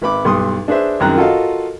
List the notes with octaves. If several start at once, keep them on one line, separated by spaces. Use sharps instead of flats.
G#1 B4 B5 D6
B1 G2 C6 D#6
D4 G#4 B4 C5 E5
C2 F#2 D#3 G#4 A#5 F#6
F4 F#4 A4 A#4 D#5 F5